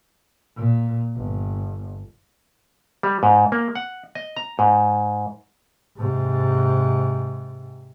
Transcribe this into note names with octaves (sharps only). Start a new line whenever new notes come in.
A#2
G1
G3
G#2
A#3
F#5
D#5
A#5
G#2
G#2 C3